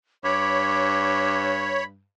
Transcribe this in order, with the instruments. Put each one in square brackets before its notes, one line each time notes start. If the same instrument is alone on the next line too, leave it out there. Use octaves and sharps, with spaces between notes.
[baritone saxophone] G2 [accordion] C#5 [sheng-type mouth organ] B5 [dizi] D6